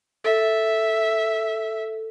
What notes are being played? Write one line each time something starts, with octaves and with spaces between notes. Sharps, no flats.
A4 E5